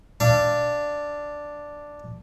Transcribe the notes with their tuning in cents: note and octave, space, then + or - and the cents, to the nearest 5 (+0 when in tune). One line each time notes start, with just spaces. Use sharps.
D4 +0 F5 -35